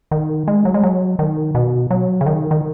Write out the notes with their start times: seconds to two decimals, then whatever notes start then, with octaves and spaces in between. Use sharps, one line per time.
0.11 D#3
0.48 G#3
0.65 F#3
0.74 G#3
0.83 F#3
1.19 D#3
1.55 B2
1.90 F#3
2.21 C#3
2.26 D#3
2.51 D#3